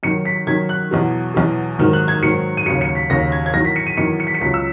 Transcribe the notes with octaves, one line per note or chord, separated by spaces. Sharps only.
F#2 D#3 F#3 C#7
B6
F#2 D#3 F#3 G#6
F#6
E2 B2 F#3
E2 B2 F#3
G#2 D#3 F#3
F#6
G#6
G#2 D#3 F#3 C#7
D#7
D#2 C#3 F#3 C#7
C#7
B6
D#2 C#3 F#3 A#6
G#6
G#6
E2 D#3 F#3 A#6
B6
C#7
D#7
E2 D#3 F#3 C#7
C#7
B6
C#7
C#2 C#3 F#3 B6
E6